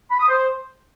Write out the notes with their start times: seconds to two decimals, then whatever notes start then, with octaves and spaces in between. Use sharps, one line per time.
0.11 B5
0.20 D#6
0.29 C5